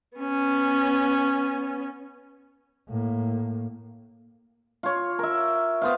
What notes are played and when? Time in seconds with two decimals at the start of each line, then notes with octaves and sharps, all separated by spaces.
0.17 B3 C#4
2.88 A2 A#3
4.83 F4 C#5
5.19 A#4 E5
5.82 B3 C5 F5